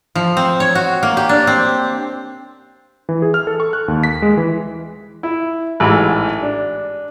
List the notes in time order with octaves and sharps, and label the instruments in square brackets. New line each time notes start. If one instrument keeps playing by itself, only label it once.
[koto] F3
C4
C#5
F#4
A#3
G4
D4
C4
[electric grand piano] E3
G#4
F6
A4
C#6
F#6
D#2
B6
G#3
E3
[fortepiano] E4
A1 G#2 E3
D4